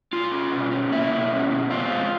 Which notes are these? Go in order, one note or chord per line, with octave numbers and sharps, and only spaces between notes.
B2 F4
C#4
B2
C#4
A#3 E4
B2
C#4
B2
C4 F4
G#3